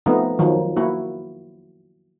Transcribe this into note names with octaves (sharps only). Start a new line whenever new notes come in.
F3 A3 B3 C4 D#4
D#3 F3 F#3
A#3 E4 F#4